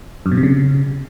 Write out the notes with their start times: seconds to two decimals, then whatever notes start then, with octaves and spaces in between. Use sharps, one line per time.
0.26 F#2
0.31 B2
0.37 C3
0.43 C#3